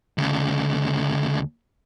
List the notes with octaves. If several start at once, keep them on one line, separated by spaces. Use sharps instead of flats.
D2 C#3